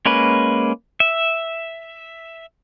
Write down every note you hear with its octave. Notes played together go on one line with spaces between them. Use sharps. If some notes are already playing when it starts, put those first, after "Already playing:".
G#3 A#3 C#4 B4
E5